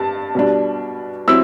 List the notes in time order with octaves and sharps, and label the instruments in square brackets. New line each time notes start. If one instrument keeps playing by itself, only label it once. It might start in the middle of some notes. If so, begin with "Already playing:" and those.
Already playing: [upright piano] G2 A5
B2 G3 D4
F#3 C4 E4 E6